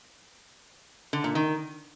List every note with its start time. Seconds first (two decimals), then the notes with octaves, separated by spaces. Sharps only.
1.13 D3
1.24 A#2
1.35 D#3